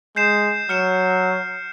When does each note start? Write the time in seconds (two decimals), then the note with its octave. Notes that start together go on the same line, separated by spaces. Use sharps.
0.16 G#3 G6 C7 E7
0.69 F#3 F6 C#7 E7